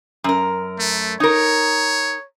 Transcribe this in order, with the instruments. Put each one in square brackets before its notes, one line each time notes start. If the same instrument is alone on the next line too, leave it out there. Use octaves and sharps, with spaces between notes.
[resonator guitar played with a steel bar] F#2 A#4
[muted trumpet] A3
[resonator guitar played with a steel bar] D#4 A#4 [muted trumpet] C#5